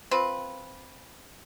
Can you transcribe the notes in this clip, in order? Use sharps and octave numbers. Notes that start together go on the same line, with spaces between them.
C4 F4 B4